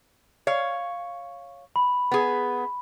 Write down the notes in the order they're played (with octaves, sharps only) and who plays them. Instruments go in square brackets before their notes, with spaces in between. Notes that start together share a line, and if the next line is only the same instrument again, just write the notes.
[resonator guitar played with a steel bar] C#5 F5
[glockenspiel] B5
[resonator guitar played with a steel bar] B3 G#4